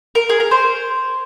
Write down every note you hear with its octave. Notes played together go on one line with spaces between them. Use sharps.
A#4
G#4
A#4
C5